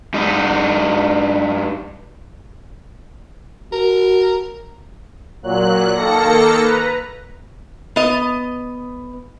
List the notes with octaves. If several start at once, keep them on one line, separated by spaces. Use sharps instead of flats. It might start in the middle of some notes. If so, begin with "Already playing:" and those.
G2 D#4
F#4 A#4
A#2 F#3 F#6
D#3 A#3 A4 A#6 C#7
B4 A#5
B3 D#5